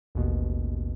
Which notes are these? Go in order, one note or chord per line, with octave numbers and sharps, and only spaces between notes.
A1 D#2 B2